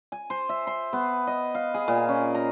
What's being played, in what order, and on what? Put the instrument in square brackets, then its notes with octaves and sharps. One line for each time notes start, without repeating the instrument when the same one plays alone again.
[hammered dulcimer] G#5
C5
E5
C6
B3
D#5
F5
G#4
A#2
C#4
A#5